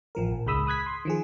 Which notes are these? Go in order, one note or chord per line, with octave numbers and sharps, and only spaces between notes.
A1 F3 A#4
A#1
C#2 G#2 G#3 B5 D#6 E6
B5 D#6 F#6 G#6 B6
C6
D#3 F3 G#4